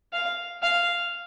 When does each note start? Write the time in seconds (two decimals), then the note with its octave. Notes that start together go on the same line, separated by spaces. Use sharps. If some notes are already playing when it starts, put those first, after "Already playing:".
0.13 F5
0.62 F5